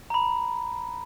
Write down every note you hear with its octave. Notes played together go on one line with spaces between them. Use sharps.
A#5 B5